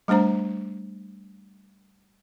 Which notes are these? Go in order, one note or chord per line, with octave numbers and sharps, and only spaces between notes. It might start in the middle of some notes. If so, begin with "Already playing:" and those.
G3 A3 D4 C5 A#5